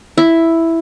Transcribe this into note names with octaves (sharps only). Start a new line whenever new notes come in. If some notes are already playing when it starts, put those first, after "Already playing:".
E4